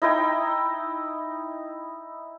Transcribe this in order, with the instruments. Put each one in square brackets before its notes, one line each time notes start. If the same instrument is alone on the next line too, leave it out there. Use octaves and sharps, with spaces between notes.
[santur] D#4 E4 D#5 G5